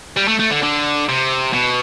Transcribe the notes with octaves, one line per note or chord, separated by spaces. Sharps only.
G3
A3
A3
D3
D3
C3
B2